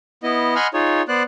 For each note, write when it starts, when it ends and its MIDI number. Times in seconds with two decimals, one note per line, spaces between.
0.23 0.55 59
0.23 0.55 64
0.23 0.55 75
0.56 0.67 75
0.56 0.67 78
0.56 0.67 80
0.56 0.67 83
0.56 0.67 84
0.56 0.67 89
0.74 1.02 63
0.74 1.02 65
0.74 1.02 68
0.74 1.02 73
1.08 1.23 59
1.08 1.23 72
1.08 1.23 74
1.08 1.23 90